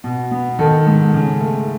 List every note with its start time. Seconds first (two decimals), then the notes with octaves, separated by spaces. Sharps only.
0.04 B2
0.31 B3
0.59 D#3 A4
0.87 G#2
1.14 C#3
1.41 A3